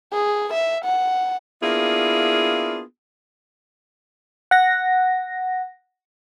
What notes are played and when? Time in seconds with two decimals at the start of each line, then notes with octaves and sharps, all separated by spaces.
0.13 G#4
0.53 E5
0.85 F#5
1.62 A#3 B3 D4 E4 F4 G#4
4.51 F#5 A#6